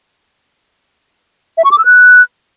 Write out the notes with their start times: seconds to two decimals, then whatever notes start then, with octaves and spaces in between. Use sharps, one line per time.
1.58 E5
1.65 C#6
1.71 D6
1.78 E6
1.85 F#6